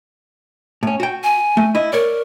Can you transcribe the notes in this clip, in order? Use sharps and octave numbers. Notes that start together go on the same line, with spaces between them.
A2 C#4
F#4 G5
G#5
A3
E4 D#5
A#4 C#5 D5